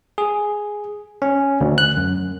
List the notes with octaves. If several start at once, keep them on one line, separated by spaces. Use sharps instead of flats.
G#4
C#4
D2
F#6
F#2